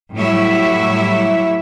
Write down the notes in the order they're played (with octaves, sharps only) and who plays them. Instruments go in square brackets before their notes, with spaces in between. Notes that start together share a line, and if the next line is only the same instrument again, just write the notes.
[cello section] A2 F#3 G3 E4 C#5 E5